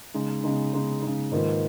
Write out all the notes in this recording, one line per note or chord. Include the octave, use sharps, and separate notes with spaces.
C#3 G#3 D#4
C#3 G#3 D#4
C#3 G#3 D#4
C#3 G#3 D#4
G#2 D#3 A#3 F4 B4